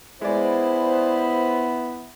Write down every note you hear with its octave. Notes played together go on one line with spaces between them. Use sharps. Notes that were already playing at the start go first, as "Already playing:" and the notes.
G#3 B3 E4 C5 D5